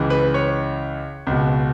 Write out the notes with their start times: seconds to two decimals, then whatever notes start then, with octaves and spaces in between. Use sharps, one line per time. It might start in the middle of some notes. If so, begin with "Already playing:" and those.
Already playing: C#2 C#3 E3
0.10 B4
0.34 C#5
1.27 C#2 B2